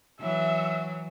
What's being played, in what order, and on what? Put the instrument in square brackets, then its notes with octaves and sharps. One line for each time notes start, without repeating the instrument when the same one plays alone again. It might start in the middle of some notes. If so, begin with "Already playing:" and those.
[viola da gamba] E3 F#3 [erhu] E5